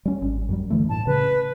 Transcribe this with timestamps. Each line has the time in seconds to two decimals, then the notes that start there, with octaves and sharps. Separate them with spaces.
0.05 G3 C#4
0.22 G#1
0.49 F#2 F#3 G3
0.70 D3 E3 A3
0.89 A2 A5
1.07 C#3 B4